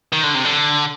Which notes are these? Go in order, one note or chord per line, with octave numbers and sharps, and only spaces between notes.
D#3
D3
C3
D3